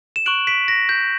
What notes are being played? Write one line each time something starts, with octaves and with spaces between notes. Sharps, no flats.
E7
C#6 F#6 D7 F#7
B6 D7
A#6
G6